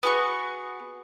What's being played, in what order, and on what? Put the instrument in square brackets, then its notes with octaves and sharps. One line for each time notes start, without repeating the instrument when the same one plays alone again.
[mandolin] B3 F#4 G#4 C#6